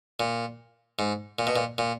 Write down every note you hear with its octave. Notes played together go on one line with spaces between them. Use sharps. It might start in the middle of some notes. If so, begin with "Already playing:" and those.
A#2
G#2
A#2
B2
A#2
A#2